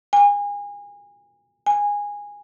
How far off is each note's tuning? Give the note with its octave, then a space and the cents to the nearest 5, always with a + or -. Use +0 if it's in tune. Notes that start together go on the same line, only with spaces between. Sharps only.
G#5 -30
G#5 -15